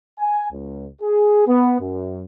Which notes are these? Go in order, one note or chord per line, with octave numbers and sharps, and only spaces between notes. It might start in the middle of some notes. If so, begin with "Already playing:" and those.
G#5
C#2
G#4
B3
F#2